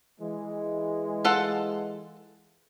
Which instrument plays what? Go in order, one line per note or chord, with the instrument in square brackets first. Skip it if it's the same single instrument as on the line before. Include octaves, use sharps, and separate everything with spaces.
[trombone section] E3 G#3
[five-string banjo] F4 A4 F#5